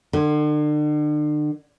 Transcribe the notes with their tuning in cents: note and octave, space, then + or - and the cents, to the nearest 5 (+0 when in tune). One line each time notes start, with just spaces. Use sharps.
D3 +40